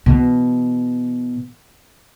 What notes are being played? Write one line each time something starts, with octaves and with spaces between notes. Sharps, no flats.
B2 E3